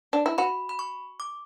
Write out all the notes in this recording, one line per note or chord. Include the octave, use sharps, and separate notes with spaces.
D4
E4
F#4 B5
B5
C#6
D6